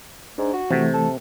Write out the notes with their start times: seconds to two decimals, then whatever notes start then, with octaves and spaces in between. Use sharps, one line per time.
0.38 G#2 D4
0.53 F#4
0.71 C3 E3 A3
0.94 A4